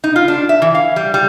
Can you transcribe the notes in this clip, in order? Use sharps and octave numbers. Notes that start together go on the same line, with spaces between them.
D#4
F4
D4
E5
E3
F5
G3
G3